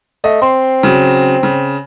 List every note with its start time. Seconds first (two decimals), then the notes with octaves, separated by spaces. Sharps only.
0.24 A3 D#5
0.42 C4 C6
0.83 C#3 F#3
1.43 C#3